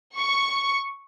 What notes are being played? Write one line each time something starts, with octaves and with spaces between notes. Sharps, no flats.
C#6